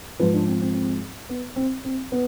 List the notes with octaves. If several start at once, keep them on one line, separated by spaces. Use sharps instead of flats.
G#2 F3 B4
D4
C4
C4
C4
B3
C4
C4
B3